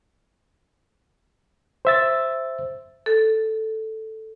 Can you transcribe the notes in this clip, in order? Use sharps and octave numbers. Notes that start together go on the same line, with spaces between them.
C5 E5 A6
A4